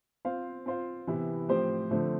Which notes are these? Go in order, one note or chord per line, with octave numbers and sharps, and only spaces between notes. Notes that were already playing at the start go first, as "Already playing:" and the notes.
C4 F4 C5 F5
C4 F4 C5 F5
C3 E3 B3 E4
A2 F3 C4 G4 C5
D3 F3 A3 C4